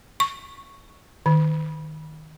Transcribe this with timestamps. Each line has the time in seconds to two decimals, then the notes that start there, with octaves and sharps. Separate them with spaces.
0.20 C#6
1.26 D#3